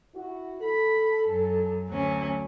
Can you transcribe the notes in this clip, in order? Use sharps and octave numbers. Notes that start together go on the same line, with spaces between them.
E4 F#4
A4 B5
F#2
D2 F#3 C#4